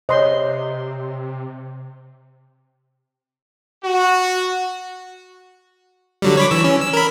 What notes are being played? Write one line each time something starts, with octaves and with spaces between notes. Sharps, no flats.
C3 C5 C#5 D#5 C6
F#4
D3 F#3 G3
C#5 B5 D6
E3 E6
C#4
E6
A#4 B5